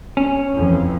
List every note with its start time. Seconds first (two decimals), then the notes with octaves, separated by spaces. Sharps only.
0.17 C#4
0.56 F2 E3